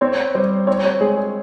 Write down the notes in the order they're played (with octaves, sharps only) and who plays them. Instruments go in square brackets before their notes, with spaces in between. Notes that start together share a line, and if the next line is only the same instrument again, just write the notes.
[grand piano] C4 [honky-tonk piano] C#5
[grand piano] G3 [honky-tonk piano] C5
[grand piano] C4 [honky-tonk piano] C#5
[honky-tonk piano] C#5
[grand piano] G#3 [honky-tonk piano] G#4
[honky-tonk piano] G#4